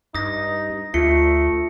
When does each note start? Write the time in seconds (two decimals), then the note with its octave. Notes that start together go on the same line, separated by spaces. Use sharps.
0.15 G2 D#4 D#6 A#6
0.94 D2 A3 F4 C#7